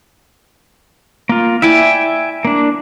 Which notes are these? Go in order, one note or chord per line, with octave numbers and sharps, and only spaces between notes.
A#3 F4
E4 D5 E5 G5 G#5
A#3 D4